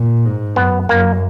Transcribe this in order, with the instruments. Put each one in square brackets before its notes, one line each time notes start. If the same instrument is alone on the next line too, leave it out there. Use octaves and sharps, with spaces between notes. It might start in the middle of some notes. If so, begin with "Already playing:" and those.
Already playing: [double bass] A#2
G#2
[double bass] F#2 [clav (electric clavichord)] B3
[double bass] F#2 [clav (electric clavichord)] A#3